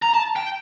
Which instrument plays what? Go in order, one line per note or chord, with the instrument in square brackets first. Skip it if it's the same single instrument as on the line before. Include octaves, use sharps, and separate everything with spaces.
[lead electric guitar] A#5
A5
G5